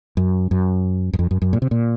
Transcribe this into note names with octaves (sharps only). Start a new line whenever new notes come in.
F#2
F#2
F#2
F2
F#2
F#2
A#2
C3
A#2